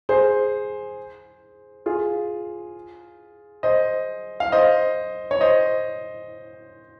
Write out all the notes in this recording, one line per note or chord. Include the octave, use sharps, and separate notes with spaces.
G#4 C5
F4 G#4
C5 D#5
F5
C5 D#5
C#5
C5 D#5